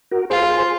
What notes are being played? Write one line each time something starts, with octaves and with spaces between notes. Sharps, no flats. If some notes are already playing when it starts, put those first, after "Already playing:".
F#4 A#4
F4 G#4 C5
G#4 C5